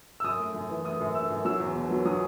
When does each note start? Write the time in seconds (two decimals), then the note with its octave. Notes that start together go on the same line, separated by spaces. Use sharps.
0.20 E6
0.24 F#2 D#6
0.39 A3
0.54 F#2
0.70 E3
0.85 A3 D#6
1.00 F#2
1.15 A3 E6
1.30 F#2
1.45 F#3 E6
1.60 E2
1.75 B2
1.91 F#3
2.05 F#3 D#6